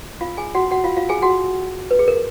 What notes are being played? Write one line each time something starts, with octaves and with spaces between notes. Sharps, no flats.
F4 F5
G#4 G#5
F#4 F#5
F#4 F#5
F4 F5
F4 F5
G#4 G#5
F#4 F#5
B4
G#4
A#4